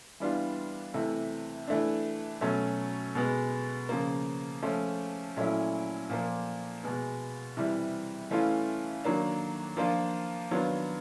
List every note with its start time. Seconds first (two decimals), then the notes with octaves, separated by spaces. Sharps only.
0.20 E3 G3 B3 D4 F4
0.94 C3 E3 A3
1.68 E3 A3 D4
2.41 B2 F#3 A3 C#4
3.15 B2 G#3 B3
3.89 C#3 F3 A#3
4.63 F3 A3 C#4
5.36 A#2 F#3 A3 C#4 E4
6.09 A#2 F3 A#3
6.83 B2 G#3 B3
7.57 C3 E3 G3
8.31 E3 A3 C#4 F4
9.04 D#3 F#3 A#3 D4
9.77 F3 A#3 D4 F4
10.51 D#3 F#3 B3 D4 F4